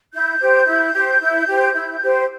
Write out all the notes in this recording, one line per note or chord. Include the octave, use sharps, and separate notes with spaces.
E4 G6
G4 C5
E4
G4 C5
E4
G4 C5
E4
G4 C5